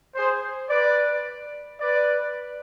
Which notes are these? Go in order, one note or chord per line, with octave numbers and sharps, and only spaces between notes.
G#4 C5
B4 D5
B4 D5